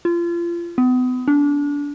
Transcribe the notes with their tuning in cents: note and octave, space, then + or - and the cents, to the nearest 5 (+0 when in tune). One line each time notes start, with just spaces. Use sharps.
F4 -30
B3 +35
D4 -25